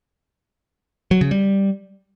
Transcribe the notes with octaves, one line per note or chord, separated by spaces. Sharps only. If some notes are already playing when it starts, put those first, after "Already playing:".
F#3
C#3
G3